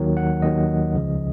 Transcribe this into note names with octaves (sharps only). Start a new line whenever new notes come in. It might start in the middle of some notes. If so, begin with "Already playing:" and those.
Already playing: D#2 D#3 F#3
F#5
D#2 D#3 F#3 D#5
C#2 C#3 F3